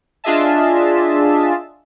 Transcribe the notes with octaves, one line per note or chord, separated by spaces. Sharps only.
D4 F4 G#4 D#5 E5 A5